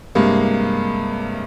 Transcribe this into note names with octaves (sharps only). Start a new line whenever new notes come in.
G2 C3 G#3 A#3